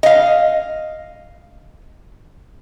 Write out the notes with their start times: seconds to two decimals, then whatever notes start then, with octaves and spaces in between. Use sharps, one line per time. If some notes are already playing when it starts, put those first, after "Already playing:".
0.03 D#5 F5